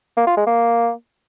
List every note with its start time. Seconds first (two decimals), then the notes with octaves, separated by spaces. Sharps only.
0.17 A#3
0.27 F4
0.37 G#3
0.47 A#3